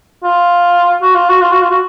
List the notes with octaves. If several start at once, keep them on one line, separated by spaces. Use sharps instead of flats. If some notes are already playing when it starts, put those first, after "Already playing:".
F4
F#4
F4
F#4
F4
F#4
F4
F#4